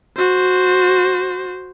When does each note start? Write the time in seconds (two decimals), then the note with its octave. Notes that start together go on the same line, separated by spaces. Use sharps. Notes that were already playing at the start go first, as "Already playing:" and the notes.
0.17 F#4 C5